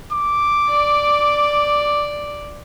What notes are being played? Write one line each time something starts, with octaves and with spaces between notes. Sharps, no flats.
D6
D5